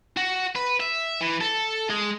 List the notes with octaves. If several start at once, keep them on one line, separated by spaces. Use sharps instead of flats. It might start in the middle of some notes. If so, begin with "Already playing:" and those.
F#4
B4
E5
E3
A4
G#3